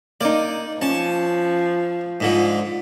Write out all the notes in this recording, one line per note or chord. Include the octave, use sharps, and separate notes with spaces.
A#3 D#4 D5
F3 C#4 A5
G#2 D3 F3